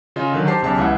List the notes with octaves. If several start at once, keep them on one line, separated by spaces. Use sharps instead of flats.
C#3 F4 D#5
D3 D#3 F#3
D#4 G4 C5 A5 C7
B1 C#3 G4 A5
C#2 E3 E5 F#5